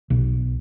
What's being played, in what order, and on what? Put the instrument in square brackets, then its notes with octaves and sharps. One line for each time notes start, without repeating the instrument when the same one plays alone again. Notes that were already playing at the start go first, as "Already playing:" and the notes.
[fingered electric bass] B1